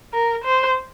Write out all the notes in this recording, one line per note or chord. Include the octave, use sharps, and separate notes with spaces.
A#4
C5